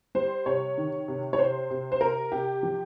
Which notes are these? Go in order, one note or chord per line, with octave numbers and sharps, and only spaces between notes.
G3 C5
C3 C#5
D#3
C3
C#5
C3 C5
C3
C5
C3 A#4
C3 G4
F3